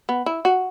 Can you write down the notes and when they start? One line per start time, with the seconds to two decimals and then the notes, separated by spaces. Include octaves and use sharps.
0.09 B3
0.26 E4
0.45 F#4